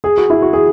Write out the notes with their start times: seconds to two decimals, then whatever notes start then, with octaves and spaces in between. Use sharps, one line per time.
0.04 G#4
0.17 F#4
0.30 E4
0.42 F#4
0.53 G#4